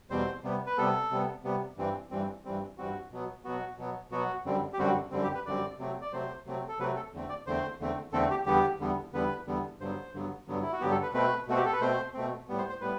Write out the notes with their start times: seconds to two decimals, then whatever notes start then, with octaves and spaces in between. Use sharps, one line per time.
0.10 E2 B2 G3 C4 C5
0.44 C3 G3 B3
0.66 B4
0.77 C3 G3 B3 A4
1.11 C3 G3 B3
1.44 C3 G3 B3
1.77 G2 E3 G3 C4
2.10 G2 E3 G3 C4
2.45 G2 E3 G3 C4
2.78 G2 E3 G3 C4 F#4
3.11 B2 F#3 B3
3.44 B2 F#3 B3 F#4
3.78 B2 F#3 B3
4.11 B2 F#3 B3 F#4
4.46 F#2 D3 G3 C4
4.73 G4
4.79 F#2 D3 G3 C4 F#4
5.11 F#2 D3 G3 C4
5.23 G4
5.35 B4
5.45 F#2 D3 G3 C4 D5
5.79 C3 F#3 A3 C4
6.01 D5
6.12 C3 F#3 A3 C4 C5
6.46 C3 F#3 A3 C4
6.68 A4
6.79 C3 F#3 A3 C4 B4
6.96 A4
7.12 E2 D3 A3 C4
7.29 D5
7.46 E2 D3 A3 C4 C5
7.79 E2 D3 A3 C4
8.12 E2 D3 A3 C4 A4
8.30 G4
8.46 E2 D3 G3 B3 G4
8.80 E2 D3 G3 B3
9.13 E2 D3 G3 B3 B4
9.47 E2 D3 G3 B3
9.80 G2 D3 F#3 B3 C5
10.13 G2 D3 F#3 B3
10.48 G2 D3 F#3 B3
10.62 E4
10.72 F#4
10.80 G2 D3 F#3 B3 G4
10.91 A4
11.02 B4
11.13 B2 A3 C4 B4
11.47 B2 A3 C4 F#4
11.57 G4
11.65 A4
11.73 B4
11.80 B2 A3 C4 C5
12.14 B2 A3 C4
12.48 A2 G3 B3
12.58 C5
12.70 C5
12.81 A2 G3 B3 B4